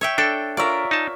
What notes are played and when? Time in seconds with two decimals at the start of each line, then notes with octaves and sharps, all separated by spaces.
0.01 C#5 E5 G5
0.18 D4 A4 G5
0.57 F4 A#4 C#5 D5 E5
0.91 D#4 A5